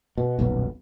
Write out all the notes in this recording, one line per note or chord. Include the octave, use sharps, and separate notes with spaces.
B2
D#1 B1 F#2 B3